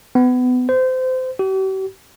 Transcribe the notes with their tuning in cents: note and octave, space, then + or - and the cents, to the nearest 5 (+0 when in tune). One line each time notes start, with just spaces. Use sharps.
B3 +25
C5 -25
G4 -45